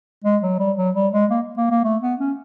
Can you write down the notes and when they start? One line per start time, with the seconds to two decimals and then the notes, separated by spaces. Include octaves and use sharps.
0.24 G#3
0.42 F#3
0.59 G3
0.77 F#3
0.95 G3
1.13 G#3
1.31 A#3
1.57 A#3
1.71 A#3
1.84 A3
2.02 B3
2.20 C#4